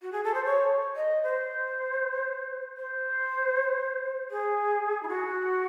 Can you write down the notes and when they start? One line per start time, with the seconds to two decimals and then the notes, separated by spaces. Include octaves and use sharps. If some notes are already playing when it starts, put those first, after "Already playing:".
0.02 F#4
0.12 G#4
0.24 A4
0.34 C5
0.45 C#5
0.96 D#5
1.23 C5
2.77 C5
4.31 G#4
5.03 E4
5.08 F#4